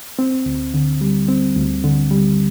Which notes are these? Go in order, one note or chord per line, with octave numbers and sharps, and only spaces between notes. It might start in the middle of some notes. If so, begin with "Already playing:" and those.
C4
D2
D3
G3
C4
D2
D3
G3